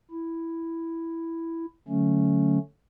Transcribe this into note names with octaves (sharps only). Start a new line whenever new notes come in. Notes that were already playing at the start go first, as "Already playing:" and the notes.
E4
D3 F#3 A3 C#4